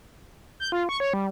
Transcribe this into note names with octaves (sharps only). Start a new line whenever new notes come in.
G6
F4
C#6
C#5
G3